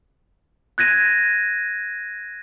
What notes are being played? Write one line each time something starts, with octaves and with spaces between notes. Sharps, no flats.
F#6 G#6 A#6 D#7